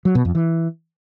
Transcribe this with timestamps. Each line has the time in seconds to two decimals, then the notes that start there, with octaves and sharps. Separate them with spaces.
0.05 F#3
0.15 B2
0.25 F2
0.35 E3